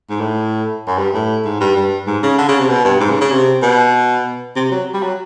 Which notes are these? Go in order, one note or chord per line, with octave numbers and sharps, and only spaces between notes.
G#2
A2
F#2
G2
A2
G#2
G2
G2
G#2
C#3
D3
C#3
C3
B2
G2
G#2
C#3
C#3
C3
B2
C3
F#3
G3
F#3